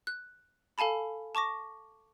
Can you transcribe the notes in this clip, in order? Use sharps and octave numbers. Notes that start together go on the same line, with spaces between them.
F#6
A4 F5 G#5 A5 B5
A5 C#6 D6 A#6